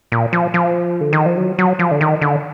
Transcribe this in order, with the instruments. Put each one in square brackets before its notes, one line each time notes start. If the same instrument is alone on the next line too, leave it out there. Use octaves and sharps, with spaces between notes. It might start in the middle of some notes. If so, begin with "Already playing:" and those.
[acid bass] A#2
F3
F3
D3
D#3
F3
F#3
F#3
F3
D3
D#3
D3